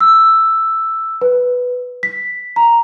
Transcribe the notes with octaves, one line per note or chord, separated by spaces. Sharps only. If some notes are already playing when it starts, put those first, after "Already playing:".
E6
B4
B6
A#5